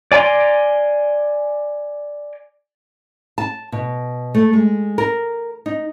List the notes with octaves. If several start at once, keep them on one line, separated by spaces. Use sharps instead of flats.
D5 G#5 A#5 C6 D6
A5
B2
A3
G#3
A#4
D#4